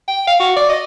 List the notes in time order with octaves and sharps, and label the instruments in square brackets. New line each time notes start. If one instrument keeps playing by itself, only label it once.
[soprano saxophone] G5
F5
F#4
D5
D#5